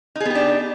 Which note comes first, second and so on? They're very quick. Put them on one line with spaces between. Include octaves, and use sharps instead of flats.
D#4 G#4 B3 G4 D4